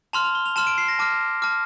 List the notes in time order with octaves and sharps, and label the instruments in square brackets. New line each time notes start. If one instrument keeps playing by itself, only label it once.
[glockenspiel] A5 C6 F6 F7
F7
G7
F7
A5 C6 F6 E7
D7
C7
A#6
A5 D6 F6
A5 D6 F6